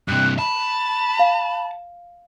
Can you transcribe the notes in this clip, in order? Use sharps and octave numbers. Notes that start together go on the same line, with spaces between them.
G2 C3 F#6
A5 B5
F5